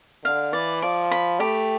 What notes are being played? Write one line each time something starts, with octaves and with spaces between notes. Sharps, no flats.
D3 F5
E3 D5
F3 D5
B5
A3 G4